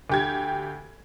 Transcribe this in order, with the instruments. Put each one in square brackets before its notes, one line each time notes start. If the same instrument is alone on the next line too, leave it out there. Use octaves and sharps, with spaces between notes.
[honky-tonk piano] D2 G4 G#6